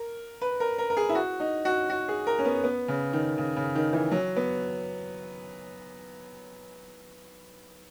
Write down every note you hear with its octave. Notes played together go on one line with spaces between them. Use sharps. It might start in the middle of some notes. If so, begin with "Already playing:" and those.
Already playing: A#4
B4
A#4
A#4
A#4
G#4
E4
F#4
D#4
F#4
F#4
G#4
A#4
C#4
B3
B3
C#3
D#3
C#3
C#3
D#3
E3
F#3
B3